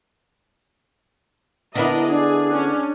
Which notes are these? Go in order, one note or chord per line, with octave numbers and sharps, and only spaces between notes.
D3 B3 D4 E4 A#4 D#5
D4 G#4
C#4